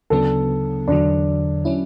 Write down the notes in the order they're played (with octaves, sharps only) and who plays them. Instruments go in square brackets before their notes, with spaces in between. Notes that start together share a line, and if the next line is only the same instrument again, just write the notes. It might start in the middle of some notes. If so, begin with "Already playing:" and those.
[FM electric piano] D2 C#3 F#3 B3 D4 [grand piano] A4
[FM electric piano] E2 D3 F#3 [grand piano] D4
[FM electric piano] F#3 C#4 E4